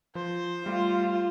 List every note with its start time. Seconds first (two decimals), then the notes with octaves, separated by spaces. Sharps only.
0.15 F3 C5
0.66 G3 A3 F4 G4